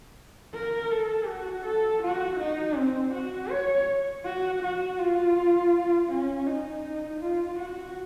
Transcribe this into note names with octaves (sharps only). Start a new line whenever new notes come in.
A#4
A4
F#4
A4
F#4
D#4
C4
F#4
C#5
F#4
F#4
F4
C#4
D#4
F4
F#4